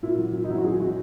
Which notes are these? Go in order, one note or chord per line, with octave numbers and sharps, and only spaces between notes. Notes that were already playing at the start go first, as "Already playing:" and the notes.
A#2 E4
F#3
A#2
D#4
F#3 E4
F#4
A#2 G#4
F#3 F#4